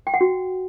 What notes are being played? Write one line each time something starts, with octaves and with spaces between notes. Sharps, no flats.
G5
F#5
F#4